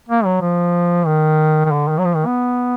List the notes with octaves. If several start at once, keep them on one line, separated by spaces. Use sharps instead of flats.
A#3
F#3
F3
D#3
D#3
D3
D#3
F#3
F3
D#3
B3